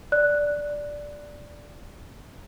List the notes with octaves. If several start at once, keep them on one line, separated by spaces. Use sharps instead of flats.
D5 F#6